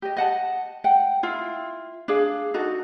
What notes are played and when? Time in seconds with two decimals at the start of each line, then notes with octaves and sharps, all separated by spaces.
0.02 G4 D#5
0.17 D#5 F#5 A5
0.84 F#5 G5
1.23 E4 F4 F5
2.08 D4 G#4 F5
2.54 D#4 F#4 A4